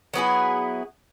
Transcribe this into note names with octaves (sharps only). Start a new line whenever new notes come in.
F#3 B3 E4 G#4